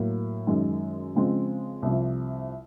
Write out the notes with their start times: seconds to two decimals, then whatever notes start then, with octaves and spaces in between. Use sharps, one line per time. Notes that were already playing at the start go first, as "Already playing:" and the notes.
Already playing: A2 F#3 A#3
0.47 F#2 D#3 G#3
1.15 C#3 F3 G#3 C4
1.82 C2 C3 F3